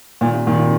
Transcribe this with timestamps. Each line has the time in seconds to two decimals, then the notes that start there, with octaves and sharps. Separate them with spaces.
0.21 A#2 D#3
0.34 C3
0.47 A#2 D#3
0.58 C3